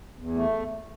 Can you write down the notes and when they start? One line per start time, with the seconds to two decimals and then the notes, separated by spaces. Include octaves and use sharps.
0.17 E2
0.35 A3